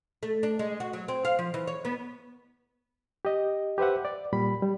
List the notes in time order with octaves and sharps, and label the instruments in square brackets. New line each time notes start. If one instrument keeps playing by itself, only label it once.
[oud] A3
D4
G#3
F#4
F#3
C4
F5
F3
E3
C#5
B3
[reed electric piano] G4 D#5
G4 B4 C5 E5 F#5
D5
A#2 G3 B5
G3